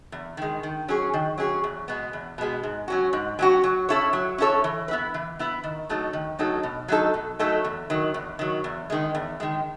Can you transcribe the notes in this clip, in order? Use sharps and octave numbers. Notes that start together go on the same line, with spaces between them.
E2
D#3 G#3
D#3
F#3 C#4 G#4 C#5
D#3
F#3 C#4 G#4 C#5
E2
B2 G#3 B3
E2
B2 G#3 B3
G#2
F#3 C#4 F#4
G#2
F#3 C#4 F#4
F#3
C#4 E4 A4 C#5
F#3
C#4 E4 A4 C#5
E3
B3 E4 B4
E3
B3 E4 B4
D#3
F#3 A3 D#4 A4
D#3
F#3 A3 D#4 A4
B2
F#3 A3 D#4 A4
B2
F#3 A3 D#4 A4
E2
D#3 F#3
E2
D#3 F#3
E2
D#3 G#3
E2
D#3 G#3